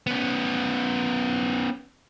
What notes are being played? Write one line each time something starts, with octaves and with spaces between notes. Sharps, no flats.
B3 C#4